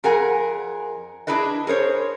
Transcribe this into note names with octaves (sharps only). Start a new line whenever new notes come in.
F2 G#4 A#4 F#5 G#5
D4 E4 G#4 B4 D#5
G#4 A#4 C5 C#5